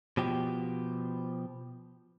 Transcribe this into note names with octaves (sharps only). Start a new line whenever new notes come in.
B2 F3 G4